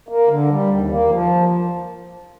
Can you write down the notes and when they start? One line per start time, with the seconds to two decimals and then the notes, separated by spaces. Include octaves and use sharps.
0.09 A#3
0.29 D3
0.49 G3
0.69 D#2
0.90 A#3
1.10 F3